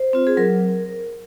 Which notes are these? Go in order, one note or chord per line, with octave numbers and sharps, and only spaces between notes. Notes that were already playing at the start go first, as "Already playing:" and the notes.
Already playing: C5
C4 F4
G#4
F#3 A#4